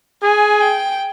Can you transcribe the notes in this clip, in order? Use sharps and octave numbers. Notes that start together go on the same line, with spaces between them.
G#4 G#5
G5